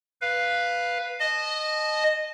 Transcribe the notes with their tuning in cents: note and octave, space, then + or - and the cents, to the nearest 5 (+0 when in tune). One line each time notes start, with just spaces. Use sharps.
B4 +0 F5 +0
D#5 -15 A5 -25